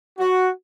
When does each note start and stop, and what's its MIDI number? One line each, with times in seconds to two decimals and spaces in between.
0.19 0.49 66